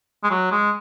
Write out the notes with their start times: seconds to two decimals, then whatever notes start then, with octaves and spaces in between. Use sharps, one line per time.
0.24 G#3
0.30 F#3
0.52 G#3